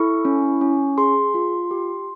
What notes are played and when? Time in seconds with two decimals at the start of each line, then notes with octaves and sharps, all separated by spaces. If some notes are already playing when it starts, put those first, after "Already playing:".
Already playing: E4 A4 C#6
0.25 C#4
0.61 C#4
0.98 G#4 C6
1.34 F4
1.71 G4